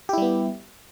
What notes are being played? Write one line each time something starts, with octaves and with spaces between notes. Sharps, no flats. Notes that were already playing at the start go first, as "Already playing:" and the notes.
G3 B3 E4 G4